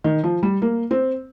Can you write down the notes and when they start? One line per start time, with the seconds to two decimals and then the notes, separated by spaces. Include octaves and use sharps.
0.04 D#3
0.23 F3
0.43 G3
0.62 A#3
0.91 C4